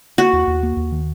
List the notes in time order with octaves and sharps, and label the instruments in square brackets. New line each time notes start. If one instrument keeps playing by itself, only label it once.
[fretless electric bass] A#3 [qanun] F#4
[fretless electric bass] D#2
D#2
A#3
D#2
D#3